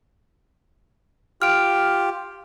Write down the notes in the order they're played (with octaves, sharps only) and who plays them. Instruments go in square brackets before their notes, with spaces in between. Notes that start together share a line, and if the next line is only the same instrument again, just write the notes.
[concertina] F4 G4 [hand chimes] F6 D7